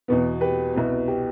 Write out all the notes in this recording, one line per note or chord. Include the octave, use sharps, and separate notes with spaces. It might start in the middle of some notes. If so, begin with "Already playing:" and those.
E2 B2 B3
G4 B4
C2 B2 B3
G4